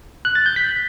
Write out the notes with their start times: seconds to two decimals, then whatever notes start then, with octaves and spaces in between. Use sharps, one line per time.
0.25 F#6
0.35 A6
0.46 G6
0.56 B6